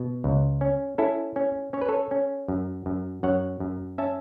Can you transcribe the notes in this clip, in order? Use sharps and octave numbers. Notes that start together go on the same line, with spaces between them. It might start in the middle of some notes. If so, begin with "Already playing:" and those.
Already playing: B2
C#2
C#4
C#4 E4 A4
C#4
C#4 C#5
B4
A4 C#5
C#4
F#2
F#2
F#2 C#5 F#5
F#2
C#4 E5 A5